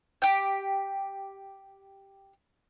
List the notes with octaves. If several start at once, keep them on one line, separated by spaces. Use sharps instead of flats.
G4 G5